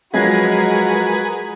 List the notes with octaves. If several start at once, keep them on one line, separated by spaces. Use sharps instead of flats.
F3 F#3 G#3 F#4 G#4 A#4 B4 G#6